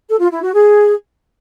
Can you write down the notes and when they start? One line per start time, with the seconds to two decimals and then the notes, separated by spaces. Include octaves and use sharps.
0.08 A4
0.20 F4
0.31 E4
0.42 F#4
0.54 G#4